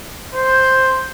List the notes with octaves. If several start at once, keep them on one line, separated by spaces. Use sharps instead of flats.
C5